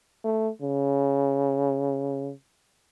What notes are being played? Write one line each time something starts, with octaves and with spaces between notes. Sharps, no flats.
A3
C#3